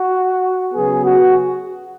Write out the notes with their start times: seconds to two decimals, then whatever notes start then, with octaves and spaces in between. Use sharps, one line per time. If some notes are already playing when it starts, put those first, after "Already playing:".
Already playing: F#4
0.73 C#3 F#3 B3 G#4
1.03 F#4